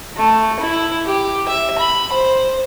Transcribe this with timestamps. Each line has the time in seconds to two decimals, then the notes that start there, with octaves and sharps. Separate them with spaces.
0.16 A3
0.59 E4
1.06 G4
1.48 E5
1.78 B5
2.12 C5